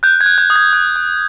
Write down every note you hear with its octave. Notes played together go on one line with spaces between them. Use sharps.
F#6 G6
G#6
F#6
G6
D#6
G#6
F#6
F#6